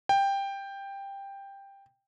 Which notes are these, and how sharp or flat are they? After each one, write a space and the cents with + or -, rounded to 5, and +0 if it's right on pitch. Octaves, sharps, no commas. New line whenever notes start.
G5 +10